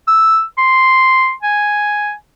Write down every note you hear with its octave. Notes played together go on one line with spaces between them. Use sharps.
E6
C6
G#5